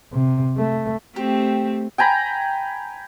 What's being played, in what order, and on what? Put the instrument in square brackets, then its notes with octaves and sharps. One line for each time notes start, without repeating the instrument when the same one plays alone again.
[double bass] C3
A3
[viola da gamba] A3 C4 [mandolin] G4
[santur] G5 G#5 A#5 B5